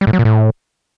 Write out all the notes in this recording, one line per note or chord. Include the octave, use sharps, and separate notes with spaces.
G3
A2
F#3
A#2
A2